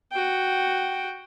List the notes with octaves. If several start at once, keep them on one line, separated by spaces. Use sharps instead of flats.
F#4 G5